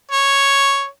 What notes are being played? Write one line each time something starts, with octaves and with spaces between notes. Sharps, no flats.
C#5